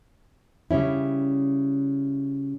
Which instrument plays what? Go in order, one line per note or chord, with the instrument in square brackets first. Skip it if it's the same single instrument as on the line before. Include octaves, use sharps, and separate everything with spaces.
[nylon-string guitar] C#3 G3 C#4 E4